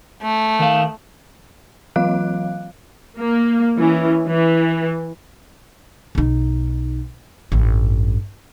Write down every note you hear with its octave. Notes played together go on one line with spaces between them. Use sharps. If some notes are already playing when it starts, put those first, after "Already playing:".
A3
D#3 F5
E3 F#3 F4 F5 F#6
A#3
E3 C#4
E3
B1 D#4
A1 G2